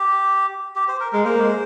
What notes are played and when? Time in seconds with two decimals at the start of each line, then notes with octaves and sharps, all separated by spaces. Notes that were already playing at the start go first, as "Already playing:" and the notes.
Already playing: G4
0.76 G4
0.88 C5
1.00 A#4
1.12 G#3 A#4
1.25 A#3 C5
1.41 G#3